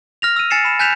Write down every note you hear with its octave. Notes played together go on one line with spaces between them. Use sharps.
F6 A#6 F7
E6 D#7
G#5 A6 C7 C#7 E7
B5 E7
G#5 F#6 G6 B6 E7 F7